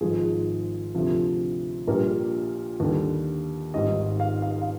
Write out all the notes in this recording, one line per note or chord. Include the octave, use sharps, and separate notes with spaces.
G#1 G#2 F3 G#4
D2 C3 F3
A#1 A#2 G3 A#4
D#2 D3 G3
G#1 G#2 G3 D#5
F5
F5
F5